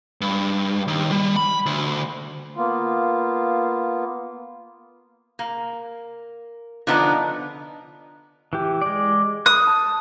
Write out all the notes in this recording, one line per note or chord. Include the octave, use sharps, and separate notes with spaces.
G2
D#2
G3
B5
D2
A#3 B3 F4
A#3
D3 F3 B3 D4 D#4
E3 G4
G#3 D5
D#6 F#6
A5